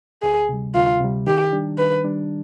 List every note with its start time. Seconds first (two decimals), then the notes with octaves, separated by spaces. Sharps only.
0.22 D2 G#4
0.49 C3 G3
0.75 D2 F4
1.00 C3 G3
1.27 D#3 G4
1.53 G3 D4
1.78 D#3 B4
2.04 G3 D4